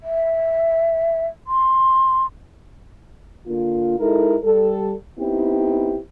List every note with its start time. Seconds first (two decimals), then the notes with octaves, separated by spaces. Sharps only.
0.03 E5
1.47 C6
3.47 D3 A#3 F4
4.00 G#3 D#4 E4 A4 A#4
4.44 G3 A4
5.19 B3 C4 D#4 E4 G4